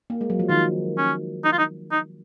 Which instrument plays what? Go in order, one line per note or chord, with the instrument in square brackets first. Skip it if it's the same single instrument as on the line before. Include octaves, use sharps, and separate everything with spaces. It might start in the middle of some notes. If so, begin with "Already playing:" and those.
[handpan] A#3
G#3
F#3
F3
[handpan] D#3 [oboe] F4
[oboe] C#4
D#4
F4
D#4
D#4